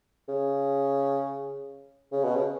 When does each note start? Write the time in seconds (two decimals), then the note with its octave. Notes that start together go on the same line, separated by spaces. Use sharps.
0.29 C#3
2.12 C#3
2.24 B2
2.35 C#3